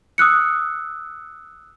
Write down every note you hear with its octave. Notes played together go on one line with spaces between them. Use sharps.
D#6 E6 F#6 C#7